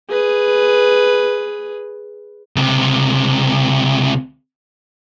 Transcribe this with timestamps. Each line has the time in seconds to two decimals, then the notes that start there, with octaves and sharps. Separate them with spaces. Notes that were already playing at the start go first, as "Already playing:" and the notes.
0.10 G#4 B4
2.56 C#2 C3